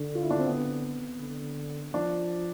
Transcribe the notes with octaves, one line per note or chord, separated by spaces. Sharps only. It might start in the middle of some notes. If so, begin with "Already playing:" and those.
Already playing: D3
F4
E4
D4
C4
B3
D3
F3 D4